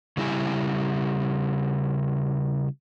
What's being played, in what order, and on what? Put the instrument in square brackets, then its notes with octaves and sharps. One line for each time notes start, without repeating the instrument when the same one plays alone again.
[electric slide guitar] C#3 G3 E4 G4 G#5